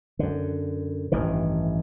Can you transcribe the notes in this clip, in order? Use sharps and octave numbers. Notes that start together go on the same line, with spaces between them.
F#2 D3
A1 G2 D#3 E3